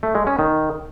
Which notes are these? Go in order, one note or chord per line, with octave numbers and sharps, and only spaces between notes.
A3
G#3
C#4
D#3